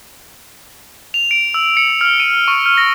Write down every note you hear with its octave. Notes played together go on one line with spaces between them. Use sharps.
F7
D7
E6
C#7
F6
D#7
C#6
F6
A#6